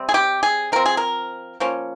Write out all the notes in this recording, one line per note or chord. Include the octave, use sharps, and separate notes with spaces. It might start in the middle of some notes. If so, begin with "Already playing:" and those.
Already playing: C3 G3 C4
G#4
G4
G#4
F3 C4 A#4
G#4
A#4
F3 A#3 C#4